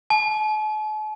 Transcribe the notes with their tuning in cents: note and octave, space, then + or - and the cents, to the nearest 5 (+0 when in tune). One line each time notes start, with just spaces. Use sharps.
A5 -45